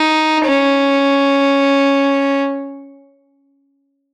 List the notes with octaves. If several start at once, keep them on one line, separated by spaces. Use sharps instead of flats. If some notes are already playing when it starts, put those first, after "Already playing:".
Already playing: D#4
C#4